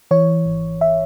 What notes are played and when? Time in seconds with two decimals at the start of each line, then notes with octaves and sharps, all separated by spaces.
0.11 E3 C#5
0.46 G#1
0.81 E5